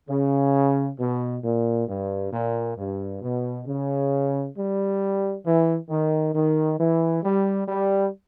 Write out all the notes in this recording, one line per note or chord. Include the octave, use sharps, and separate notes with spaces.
C#3
B2
A#2
G2
A#2
G2
B2
C#3
G3
E3
D#3
D#3
E3
G3
G3